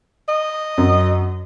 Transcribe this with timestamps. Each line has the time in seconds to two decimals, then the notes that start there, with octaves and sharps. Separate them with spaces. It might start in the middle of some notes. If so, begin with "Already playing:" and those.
0.29 D#5
0.78 F#2